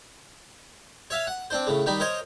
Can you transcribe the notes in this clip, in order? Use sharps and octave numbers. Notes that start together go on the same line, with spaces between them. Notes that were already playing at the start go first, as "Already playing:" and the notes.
C#5 E5 F5
F#5
C4 D4 C5
A2 C#3
D#3 G3 D#4 B5
A#4 C5 C#5 D#5